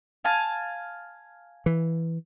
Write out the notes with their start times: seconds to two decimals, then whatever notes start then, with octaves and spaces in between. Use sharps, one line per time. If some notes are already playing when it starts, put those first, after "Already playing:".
0.24 F5 G#5 A5
1.66 E3